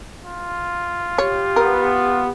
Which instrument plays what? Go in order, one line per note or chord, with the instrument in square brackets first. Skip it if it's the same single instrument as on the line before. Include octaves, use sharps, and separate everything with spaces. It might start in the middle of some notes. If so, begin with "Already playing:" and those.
[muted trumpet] F4
[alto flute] G4 [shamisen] C#5
[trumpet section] B3 [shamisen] A#4